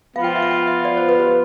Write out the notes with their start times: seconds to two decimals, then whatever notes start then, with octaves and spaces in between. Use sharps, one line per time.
0.16 F3 B3 F4 F5
0.24 G5
0.35 E5
0.42 F5
0.51 G5
0.67 E5
0.85 D5
0.97 C5
1.09 B4
1.20 G4